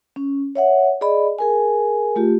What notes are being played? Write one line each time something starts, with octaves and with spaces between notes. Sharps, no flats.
C#4
C#5 E5 F#5
G#4 D5 D#5 B5
G#4 A#4 G#5
A3 F4 G4